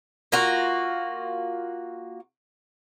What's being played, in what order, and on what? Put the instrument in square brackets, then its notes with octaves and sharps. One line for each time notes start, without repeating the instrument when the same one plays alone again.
[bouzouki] A#3 F4 F#4